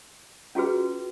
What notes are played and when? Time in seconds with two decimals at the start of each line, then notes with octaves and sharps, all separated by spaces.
0.55 C#4 F4 F#4 G#4 B4